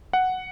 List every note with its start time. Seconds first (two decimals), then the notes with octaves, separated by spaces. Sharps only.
0.13 F#5